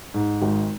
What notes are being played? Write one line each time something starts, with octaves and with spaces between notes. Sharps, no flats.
G#2
G#1